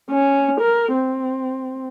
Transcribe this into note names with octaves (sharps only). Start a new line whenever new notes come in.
C#4
A#4
C4